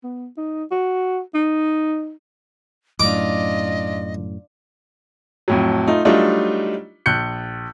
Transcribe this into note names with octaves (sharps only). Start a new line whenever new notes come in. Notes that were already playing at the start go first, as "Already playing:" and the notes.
B3
D#4
F#4
D#4
F#2 A2 D4 F4 D#5 D6
F2 A2 F#3
A3 D#4 F4
F#3 G3 A3 D4 D#4 F4
A#1 F#6 G6 C#7